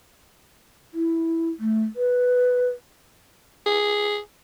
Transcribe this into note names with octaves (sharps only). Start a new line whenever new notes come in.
E4
A3
B4
G#4